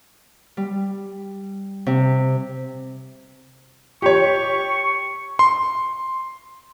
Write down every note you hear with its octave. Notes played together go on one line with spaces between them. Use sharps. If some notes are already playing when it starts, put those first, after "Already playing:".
G3
C3
G4 C#5 C#6
C6